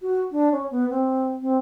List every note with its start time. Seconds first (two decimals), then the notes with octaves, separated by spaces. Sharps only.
0.01 F#4
0.31 D4
0.52 C#4
0.71 B3
0.90 C4
1.41 C4